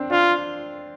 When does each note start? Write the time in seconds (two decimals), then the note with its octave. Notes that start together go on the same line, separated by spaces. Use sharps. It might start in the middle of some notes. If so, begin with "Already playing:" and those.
Already playing: C4 D4
0.11 D4 F4